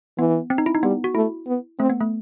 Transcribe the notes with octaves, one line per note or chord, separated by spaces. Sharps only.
E3 B3
C4
D#4
E4
D#4
G3 B3
F#4
A3 E4
B3
A3 C4
B3
A3